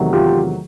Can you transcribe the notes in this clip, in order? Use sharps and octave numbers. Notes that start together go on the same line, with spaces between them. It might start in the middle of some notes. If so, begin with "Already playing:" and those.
Already playing: E2 C3 D#3 F#3 A3
F4 G4